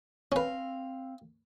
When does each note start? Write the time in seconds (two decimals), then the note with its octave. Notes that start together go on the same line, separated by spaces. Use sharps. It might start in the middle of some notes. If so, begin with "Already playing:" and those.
0.32 C4 C#4 B4 F5